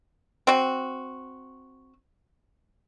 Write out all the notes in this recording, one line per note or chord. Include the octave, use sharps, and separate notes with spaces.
C4 F#4